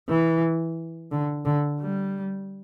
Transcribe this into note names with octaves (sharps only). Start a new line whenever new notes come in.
E3
D3
D3
G3